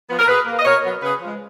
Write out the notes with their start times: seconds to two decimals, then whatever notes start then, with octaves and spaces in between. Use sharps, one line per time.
0.10 F3 B3
0.19 A#4
0.28 B2 G#4 B4
0.46 A#3
0.59 D#5
0.65 B2 A#4 C#5
0.84 F#3 B3
1.02 C#3 G#4 B4
1.21 F3 G#3